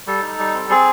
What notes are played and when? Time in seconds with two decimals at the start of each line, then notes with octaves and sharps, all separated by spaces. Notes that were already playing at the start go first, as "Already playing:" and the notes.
0.07 G3 A4
0.22 D#4
0.39 G3
0.53 C4
0.70 C4 G#4